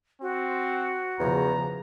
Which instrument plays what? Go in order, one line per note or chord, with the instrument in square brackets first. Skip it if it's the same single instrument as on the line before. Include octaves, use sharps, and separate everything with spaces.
[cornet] C4 [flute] F#4
[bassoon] E2 [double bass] C#3 F3 [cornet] A#5